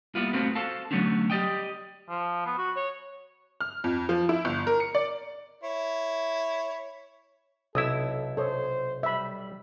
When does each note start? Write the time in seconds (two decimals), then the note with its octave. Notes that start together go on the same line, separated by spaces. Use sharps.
0.15 G3 A#3 B3 E4 F4
0.33 A3 B3 C4 F4 F#4 B4
0.55 F#4 A4 C5 F5 A5
0.91 D3 F#3 A3 B3 C#4 D4
1.30 G4 D5 D#5 G5
2.09 F3
2.46 B3
2.58 F#4
2.76 C#5
3.61 F6
3.84 F2
4.09 F3
4.29 E4
4.45 G1
4.67 A#4
4.80 C#7
4.95 D5
5.63 E4 C#5
7.75 B1 C3 E4 A4 D#6 E6
8.37 A4 C5 C#5 D#6
9.03 G3 E5 B5